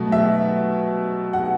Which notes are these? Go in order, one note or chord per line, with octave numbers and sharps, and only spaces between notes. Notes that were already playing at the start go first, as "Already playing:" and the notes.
Already playing: B2 F#3 A3
E5
F#5